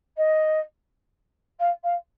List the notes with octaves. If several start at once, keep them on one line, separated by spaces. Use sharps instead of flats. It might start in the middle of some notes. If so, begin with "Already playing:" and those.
D#5
F5
F5